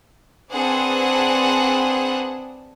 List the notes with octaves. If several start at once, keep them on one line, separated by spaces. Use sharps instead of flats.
C4 D4 G#4 B4 F#5